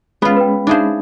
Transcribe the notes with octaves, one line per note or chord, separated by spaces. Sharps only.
G#3 B3 C#4 F4 B5
B4 G5
D4 D#4 G#4 C5 E5 F5